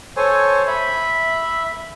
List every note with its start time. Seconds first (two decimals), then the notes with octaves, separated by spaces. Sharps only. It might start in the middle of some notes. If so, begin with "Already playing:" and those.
0.17 A4 C5 C#5 G#5
0.67 E5 B5